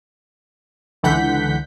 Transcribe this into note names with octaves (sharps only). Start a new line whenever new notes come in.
C#2 D3 E3 F#5 G6 B6